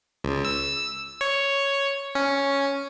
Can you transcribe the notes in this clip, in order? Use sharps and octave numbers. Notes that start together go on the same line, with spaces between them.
C#2
E6
C#5
C#4